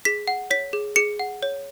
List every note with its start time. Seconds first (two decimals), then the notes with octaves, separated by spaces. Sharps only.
0.05 G#4 B6
0.27 F#5
0.51 C#5 B6
0.73 G#4
0.96 G#4 C#7
1.19 F#5
1.43 C#5